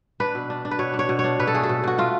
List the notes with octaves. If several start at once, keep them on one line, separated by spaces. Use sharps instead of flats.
D4 B4
B2
D4
D4
B4
B2 C#5
D4
C#5
B2
C#5
D4
B2 B4
A4
A3 G#4
A4
B2
B2 F#4
A3 F4